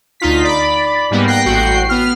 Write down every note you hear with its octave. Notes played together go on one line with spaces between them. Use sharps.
D2 D#4 F4 B6
D5 B5
G#2 G3 A#3 B3
G5 F#6 A#6 C7
A1 F#4 G5 C7
B3 F6